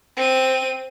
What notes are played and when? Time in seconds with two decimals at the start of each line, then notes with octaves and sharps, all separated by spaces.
0.17 C4 D#7